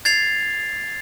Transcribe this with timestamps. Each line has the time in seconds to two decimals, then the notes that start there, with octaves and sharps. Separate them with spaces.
0.05 G#6 A6 C7 F7